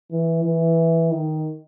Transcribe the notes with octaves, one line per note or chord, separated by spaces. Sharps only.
E3
E3
D#3